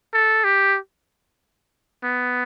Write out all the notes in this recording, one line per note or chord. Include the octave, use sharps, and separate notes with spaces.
A4
G4
B3